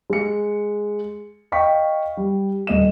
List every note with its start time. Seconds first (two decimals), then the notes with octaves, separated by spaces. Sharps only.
0.10 G#3 C#7
1.52 D#5 F5 G5 C#6 B6
2.17 G3
2.67 D#1 D#5 E7